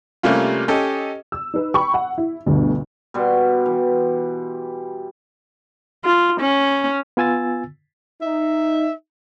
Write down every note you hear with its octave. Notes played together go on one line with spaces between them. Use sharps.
C3 G3 A3 A#3 C#4 F4
C#4 G4 A4 D#5
E6
D#4 B4
G5 B5 C#6
F#5
E4
G1 D2 B2 D3
B2 G3 C6
E3
F4
C#4
B3 F4 G#5 E6 A6
D#4 E5